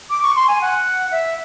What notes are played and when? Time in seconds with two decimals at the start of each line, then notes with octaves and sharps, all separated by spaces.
0.10 D6
0.23 C#6
0.36 C6
0.48 G#5
0.61 F#5
1.11 E5